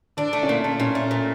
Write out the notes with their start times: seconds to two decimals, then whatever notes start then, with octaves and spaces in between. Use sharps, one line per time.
0.17 D3 D4
0.33 A3
0.43 C#4
0.48 A#2 A#3
0.64 A3
0.80 A#2 C#4
0.95 A3
1.11 A#2